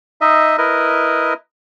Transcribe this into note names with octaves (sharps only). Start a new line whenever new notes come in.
D#4 D#5 E5
E4 A#4 B4 D#5